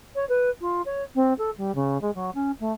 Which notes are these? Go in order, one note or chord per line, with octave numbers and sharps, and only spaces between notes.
C#5
B4
F4
C#5
C4
A4
G3
C#3
G#3
F#3
C#4
A3